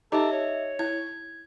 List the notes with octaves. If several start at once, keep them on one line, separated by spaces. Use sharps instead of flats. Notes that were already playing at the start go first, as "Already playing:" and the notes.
D#4 G4 A4 D#5 E5
C#5
E4 G#6